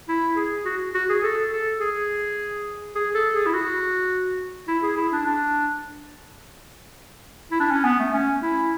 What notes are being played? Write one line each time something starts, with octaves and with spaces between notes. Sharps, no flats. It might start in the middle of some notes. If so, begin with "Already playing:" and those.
E4
G#4
F#4
F#4
G#4
A4
A4
G#4
G#4
A4
G#4
E4
F#4
E4
G#4
E4
D4
D4
E4
D4
C#4
B3
A3
C#4
E4